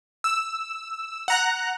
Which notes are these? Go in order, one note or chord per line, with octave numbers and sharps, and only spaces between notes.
E6
F#5 A#5 F#6